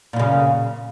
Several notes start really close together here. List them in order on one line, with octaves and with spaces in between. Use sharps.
A#2 F#2 C#3